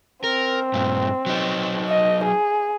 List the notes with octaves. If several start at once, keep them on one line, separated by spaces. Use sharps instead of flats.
C4 A#4
G2 A#2
F#3 D#4
D#5
G#4